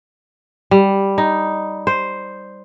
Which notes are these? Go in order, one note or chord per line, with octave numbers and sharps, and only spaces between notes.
G3
D#4
C5